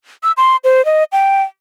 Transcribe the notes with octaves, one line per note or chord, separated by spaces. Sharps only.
E6
C6
C5
D#5
G5